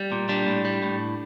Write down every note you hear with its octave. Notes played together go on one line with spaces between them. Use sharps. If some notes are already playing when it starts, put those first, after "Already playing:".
Already playing: G3
A#2
G3 D4
A2
G3
A2